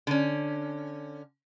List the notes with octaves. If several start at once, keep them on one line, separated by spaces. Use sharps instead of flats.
D3 C#4